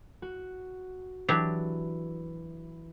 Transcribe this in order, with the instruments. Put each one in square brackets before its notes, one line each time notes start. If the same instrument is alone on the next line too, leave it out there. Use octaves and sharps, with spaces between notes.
[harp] F#4
[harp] E3 [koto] F#3 D4 G4